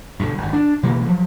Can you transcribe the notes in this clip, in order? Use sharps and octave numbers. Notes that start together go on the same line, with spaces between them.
G2 B2 D3
G#1 G2
D4
B2 E3 G3 A#3
D2 F3 F#3